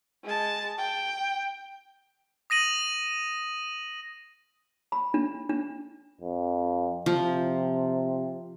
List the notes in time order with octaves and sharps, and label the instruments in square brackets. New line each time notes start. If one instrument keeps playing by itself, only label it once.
[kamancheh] G#3 A5
G5
[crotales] D#6 A#6 D#7 F#7
[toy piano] B5
D4
D4
[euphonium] F2
[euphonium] C3 [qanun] F3